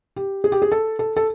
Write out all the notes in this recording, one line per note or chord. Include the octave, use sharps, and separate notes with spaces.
G4
G#4
G4
G#4
A4
A4
A4